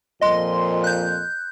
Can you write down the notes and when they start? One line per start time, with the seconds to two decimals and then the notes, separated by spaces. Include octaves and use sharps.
0.21 F2 A#2 F3 D#5 C6
0.84 F#6 G6